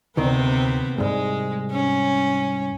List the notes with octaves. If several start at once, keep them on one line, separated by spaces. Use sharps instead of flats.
D2 C3 D#3 B3 C4
C2 G#2 G#3
C#4